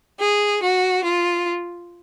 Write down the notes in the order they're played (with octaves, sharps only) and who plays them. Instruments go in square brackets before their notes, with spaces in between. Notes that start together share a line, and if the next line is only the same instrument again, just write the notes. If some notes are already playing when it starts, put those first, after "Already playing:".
[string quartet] G#4
F#4
F4